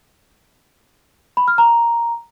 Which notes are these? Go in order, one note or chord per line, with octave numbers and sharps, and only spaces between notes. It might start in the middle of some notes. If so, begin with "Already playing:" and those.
B5
F6
A#5